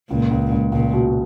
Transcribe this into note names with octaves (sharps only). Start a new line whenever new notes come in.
C#2 A#2
C#2
C#2
C#2 A#2
B2